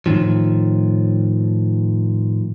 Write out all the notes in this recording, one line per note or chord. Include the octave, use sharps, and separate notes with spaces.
A2 D#3 F3